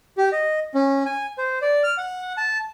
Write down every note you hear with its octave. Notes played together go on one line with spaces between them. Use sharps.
G4
D#5
C#4
G#5
C5
D5
F6
F#5
A5